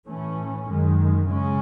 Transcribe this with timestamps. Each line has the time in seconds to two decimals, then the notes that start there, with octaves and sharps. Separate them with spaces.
0.08 A2 E3 A3 C#4
0.68 F#2 D#3 G#3
1.29 C#3 G#3 C#4